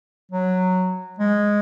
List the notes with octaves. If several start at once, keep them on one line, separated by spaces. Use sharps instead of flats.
F#3
G#3